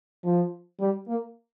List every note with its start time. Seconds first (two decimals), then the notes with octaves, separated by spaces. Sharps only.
0.24 F3
0.80 G3
1.08 A#3